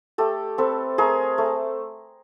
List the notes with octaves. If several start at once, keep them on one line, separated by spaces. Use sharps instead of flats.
A3 G4 A4
C4 A4 B4
A3 G#4 A#4
A3